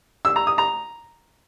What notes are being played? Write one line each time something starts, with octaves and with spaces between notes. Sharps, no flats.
E6
A#5
D#6
A#5